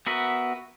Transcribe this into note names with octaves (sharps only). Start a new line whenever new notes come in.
B3 F#4 A#4 E5